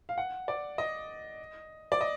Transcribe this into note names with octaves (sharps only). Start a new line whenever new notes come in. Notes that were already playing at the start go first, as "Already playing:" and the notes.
F5
F#5
D5
D#5
D5
D#5